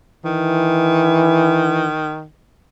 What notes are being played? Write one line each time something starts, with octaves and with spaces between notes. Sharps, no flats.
D#3 E3